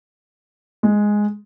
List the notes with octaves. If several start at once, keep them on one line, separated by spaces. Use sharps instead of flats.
G#3